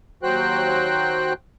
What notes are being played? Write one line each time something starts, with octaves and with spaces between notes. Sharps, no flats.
D#2 F#3 F#4 C5 G5 F#6